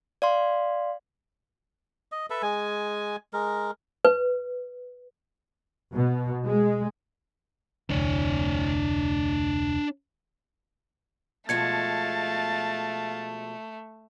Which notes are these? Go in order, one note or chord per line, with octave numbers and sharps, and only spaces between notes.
D5 F5 C6
D#5
A4 B4 E5
G#3 G#5
G#3 A#4
B4
B2
G#3
F1 D2 D4 C#5
B2 F3 G#3 A3 F5 A5 G#6 C#7